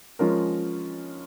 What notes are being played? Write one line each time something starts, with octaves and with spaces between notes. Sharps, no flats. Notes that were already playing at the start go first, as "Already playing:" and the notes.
F3 G#3 C#4 F4 A#4